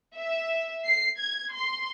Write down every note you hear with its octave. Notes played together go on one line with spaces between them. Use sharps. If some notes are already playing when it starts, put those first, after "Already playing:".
E5
C7
G#6
C6